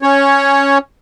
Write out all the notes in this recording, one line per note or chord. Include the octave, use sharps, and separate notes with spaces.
C#4 C#5